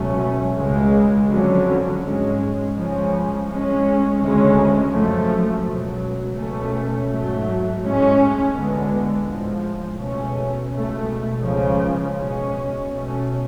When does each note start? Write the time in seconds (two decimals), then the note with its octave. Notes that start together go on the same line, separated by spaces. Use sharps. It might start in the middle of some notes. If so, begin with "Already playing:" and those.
Already playing: C#2 B2 F#3 A3 C#4
0.57 C#2 C#3 G#3
1.29 F2 D3 F#3 C#4
2.01 G#2 G#3 C#4
2.74 C#2 C#3 F3 G#3 C#4
3.46 A2 G#3 C#4
4.18 D2 C#3 G#3 C#4
4.91 F#2 F3 A3
5.63 C#2 B2 F#3
6.35 C#2 B2 A3 C#4
7.08 G#2 F#3 A3
7.80 A2 G#3 C#4
8.52 D2 D3 G#3 B3
9.25 A2 F3 G#3
9.97 C#2 B2 A3 C#4
10.70 C#2 B2 A3
11.42 C#2 C#3 F3
12.14 B2 G#3 C#4
12.87 B2 A3 C#4